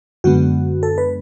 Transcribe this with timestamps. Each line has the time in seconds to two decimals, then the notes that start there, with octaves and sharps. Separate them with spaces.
0.24 F#2 D3 G#3 B3 F#4
0.83 A4
0.98 B4